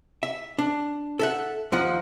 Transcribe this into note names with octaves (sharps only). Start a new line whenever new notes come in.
E5
D4
A4 E5 F#5
D#2 F3 D#4 F#5